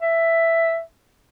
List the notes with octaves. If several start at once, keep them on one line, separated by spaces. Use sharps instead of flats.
E5